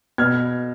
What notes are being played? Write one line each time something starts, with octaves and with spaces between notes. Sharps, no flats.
B2 F6 G#6